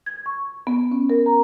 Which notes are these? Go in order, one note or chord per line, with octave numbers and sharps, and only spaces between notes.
G#6
C#6
B3
C#4
A#4
A#5